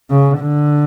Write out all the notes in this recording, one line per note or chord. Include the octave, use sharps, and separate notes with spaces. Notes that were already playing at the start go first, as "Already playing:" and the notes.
C#3
D3